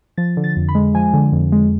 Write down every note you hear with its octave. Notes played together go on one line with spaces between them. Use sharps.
F3 A6
D3
A6
F2
B5
G#3
F3 G#5
D3
F2
G#3